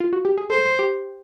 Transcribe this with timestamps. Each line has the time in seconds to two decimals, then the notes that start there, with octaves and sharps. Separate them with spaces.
0.00 F4
0.13 F#4
0.25 G4
0.37 G#4
0.50 A4 C5
0.79 G4